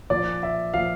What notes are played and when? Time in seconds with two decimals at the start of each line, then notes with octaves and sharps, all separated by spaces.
0.10 A#2 F3 D5
0.43 E5
0.74 A#2 F3 F5